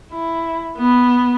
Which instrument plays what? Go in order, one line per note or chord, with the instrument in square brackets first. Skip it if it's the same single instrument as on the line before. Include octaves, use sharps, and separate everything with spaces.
[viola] E4
B3